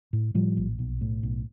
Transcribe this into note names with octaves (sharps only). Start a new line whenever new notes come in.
A2
A2 F3 G3
A#1
B1
A2
B1